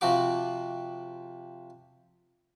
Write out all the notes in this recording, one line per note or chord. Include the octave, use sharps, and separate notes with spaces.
C3 F3 F#4 D6